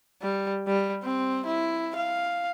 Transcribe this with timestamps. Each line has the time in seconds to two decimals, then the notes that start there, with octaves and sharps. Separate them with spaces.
0.22 G3
0.67 G3
1.03 C4
1.46 E4
1.96 F5